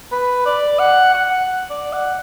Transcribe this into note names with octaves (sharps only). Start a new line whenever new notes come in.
B4
D5
F#5
F#5
D5
F#5